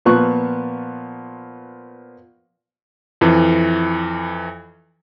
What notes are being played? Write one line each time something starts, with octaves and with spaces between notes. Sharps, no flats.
A#2 F3 B3 C#6 F#6
F2 E3